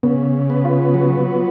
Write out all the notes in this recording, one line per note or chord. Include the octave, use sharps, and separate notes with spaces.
C#3 B3
B3
F4
F#3